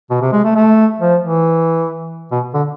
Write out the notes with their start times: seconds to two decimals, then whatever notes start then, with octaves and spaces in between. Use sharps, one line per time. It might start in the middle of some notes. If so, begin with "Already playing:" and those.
0.10 B2
0.22 C3
0.32 G#3
0.45 A3
0.55 A3
1.00 F3
1.21 E3
2.32 B2
2.54 D3